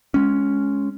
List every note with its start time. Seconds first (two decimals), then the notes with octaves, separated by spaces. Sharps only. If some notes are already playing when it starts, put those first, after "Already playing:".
0.14 G#3 C#4